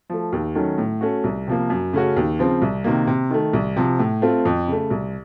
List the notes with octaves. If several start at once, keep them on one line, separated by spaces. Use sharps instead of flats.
F3 A3
D#2
D#3 F#3 A3 C#4
A2
A3 C#4 F#4
C2
C3 F3 A#3
F#2
C#3 A3 C#4 F#4
D#2
C#3 F3 C4
C2
C3 D#3 A#3
C3
D#3 A3
C2
C3 F3
A2
A3 C4 F4
F2
C#3 A3
C2